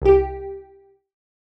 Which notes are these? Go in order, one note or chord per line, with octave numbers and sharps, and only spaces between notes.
C2 G4